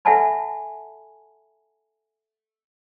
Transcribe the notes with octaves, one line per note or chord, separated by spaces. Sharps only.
A4 E5 F#5 G#5 A5 B5